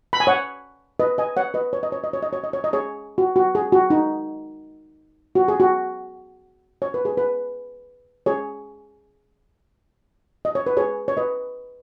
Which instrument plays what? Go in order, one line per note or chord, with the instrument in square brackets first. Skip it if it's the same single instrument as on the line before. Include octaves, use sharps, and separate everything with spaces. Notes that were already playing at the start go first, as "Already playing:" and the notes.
[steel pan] B5
G#5
C#5 F#5
B4 D#5
D#5 G#5
C#5 F#5
B4 D#5
C#5
D#5
C#5
D#5
C#5
D#5
C#5
D#5
C#5
D#5
G#4 C#5
F#4
F#4
G#4
F#4
D#4
F#4
G#4
F#4
C#5
B4
G#4
B4
G#4 C#5
D#5
C#5
B4
G#4 C#5
C#5
B4 D#5